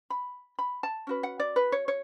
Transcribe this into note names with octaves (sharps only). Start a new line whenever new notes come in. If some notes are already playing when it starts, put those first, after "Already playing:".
B5
B5
A5
C#4 F#4 B4
F#5
D5
B4
C#5
C#5